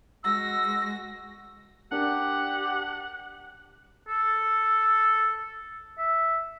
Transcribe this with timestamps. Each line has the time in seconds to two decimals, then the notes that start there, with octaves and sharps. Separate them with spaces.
0.24 G#3 F#4 E6 A#6
1.91 D4 G4 A#4 F#5
4.08 A4
5.98 E5